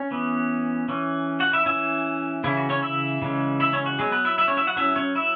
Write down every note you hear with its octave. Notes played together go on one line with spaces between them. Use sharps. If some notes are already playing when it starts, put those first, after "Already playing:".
Already playing: C#4 C#5
E3 B3
E3 C#4
F#4 F#5
E4 E5
E3 C#4 E4 E5
C#3 E3 C#4 E4
F#4
C#4 C#5
E4 E5
C#3 E3 G#3 C#4
E4 E5
C#4 C#5
F#4
F#3 G#3 B3 G#4
B3 B4
E4 E5
E4 E5
C#4 C#5
E4 E5
F#4 F#5
F#3 C#4 E4 E5
C#4 C#5
E4 E5